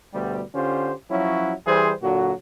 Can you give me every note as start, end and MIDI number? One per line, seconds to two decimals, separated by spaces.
0.13 0.42 38
0.13 0.42 47
0.13 0.42 55
0.54 0.92 50
0.54 0.92 61
0.54 0.92 65
0.54 0.92 67
0.54 0.92 72
1.10 1.53 53
1.10 1.53 54
1.10 1.53 61
1.10 1.53 64
1.10 1.53 66
1.66 1.92 52
1.66 1.92 55
1.66 1.92 68
1.66 1.92 72
2.02 2.32 46
2.02 2.32 50
2.02 2.32 54
2.02 2.32 66